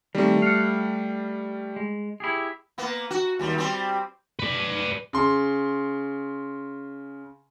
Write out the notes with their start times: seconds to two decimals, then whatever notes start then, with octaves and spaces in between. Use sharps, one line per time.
0.15 D#3 G3 A3 C4
0.42 F5 F#5
1.76 G#3
2.20 E4 G4 G#4
2.78 A#3 B3
3.10 F#4
3.39 D#2 G3
3.58 G3 C4
4.39 B4 D5
5.13 C#3 C6